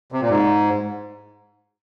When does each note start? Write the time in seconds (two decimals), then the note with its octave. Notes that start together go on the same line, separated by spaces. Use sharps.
0.12 C3
0.21 A#2
0.30 G#2